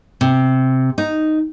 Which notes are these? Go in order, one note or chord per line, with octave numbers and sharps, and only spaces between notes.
C3
D#4